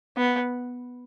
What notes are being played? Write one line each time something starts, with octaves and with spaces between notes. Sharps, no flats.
B3